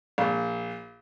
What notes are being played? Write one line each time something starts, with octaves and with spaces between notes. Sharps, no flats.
A#1